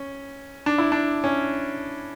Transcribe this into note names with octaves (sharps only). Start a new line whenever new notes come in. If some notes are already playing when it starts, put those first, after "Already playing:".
Already playing: C#4
D4
E4
D4
C#4